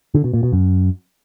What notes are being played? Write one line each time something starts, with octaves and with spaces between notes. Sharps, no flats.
D3
B2
A#2
B2
F#2